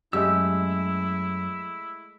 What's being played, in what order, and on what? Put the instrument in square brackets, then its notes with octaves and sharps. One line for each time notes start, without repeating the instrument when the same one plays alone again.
[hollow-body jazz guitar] F#2 [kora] G#3 A3 G4 [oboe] E4 [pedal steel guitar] E6